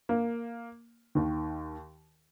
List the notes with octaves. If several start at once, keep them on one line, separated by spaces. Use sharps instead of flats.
A#3
D#2 D#3